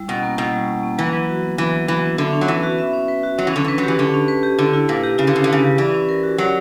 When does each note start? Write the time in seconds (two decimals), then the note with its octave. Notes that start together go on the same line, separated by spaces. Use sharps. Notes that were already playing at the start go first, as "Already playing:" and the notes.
Already playing: G3 E4
0.08 B2 C#4
0.23 A#3
0.38 B2 E4
0.53 G3
0.68 C#4
0.83 A#3
0.98 E3 F#3
1.13 F#3
1.29 F#4
1.43 B3
1.58 E3 F#3
1.73 F#3
1.88 E3 F#4
2.04 B3
2.18 D3 E5
2.33 C#4
2.41 F#3
2.48 E3 B4
2.63 F#4
2.78 E5
2.93 C#4
3.08 B4
3.23 F#4
3.38 F#3 C#4
3.47 E3
3.54 D3 C#4
3.65 E3 B4
3.78 F#3
3.83 E3 G4
3.98 D3 C#4
4.14 C#4
4.28 B4
4.43 G4
4.59 D3 E4
4.73 E4
4.88 A#2 B4
5.04 G4
5.18 C#3 E4
5.27 D3
5.33 C#3 E4
5.44 D3
5.48 C#3 B4
5.64 G4
5.78 E3 D5
5.94 C#4
6.09 A#4
6.24 F#4
6.38 F#3 D5